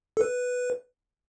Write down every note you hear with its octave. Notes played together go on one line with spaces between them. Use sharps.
A4
B4